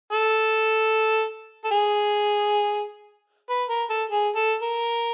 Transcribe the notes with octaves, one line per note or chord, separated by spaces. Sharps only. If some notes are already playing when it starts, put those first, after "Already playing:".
A4
A4
G#4
B4
A#4
A4
G#4
A4
A#4